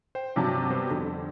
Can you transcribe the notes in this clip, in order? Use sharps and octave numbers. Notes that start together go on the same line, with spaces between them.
C5 G5
G2 C3 F#3 A5
G3 B3 C5
F2 D3